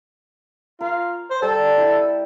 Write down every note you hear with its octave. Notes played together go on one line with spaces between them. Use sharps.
F4 A#4
C5
G3 A4
E4 G4